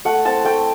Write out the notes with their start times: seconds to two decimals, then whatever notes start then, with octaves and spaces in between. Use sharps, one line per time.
0.05 A3 F#5
0.25 C4 E4 A5
0.45 A3 G5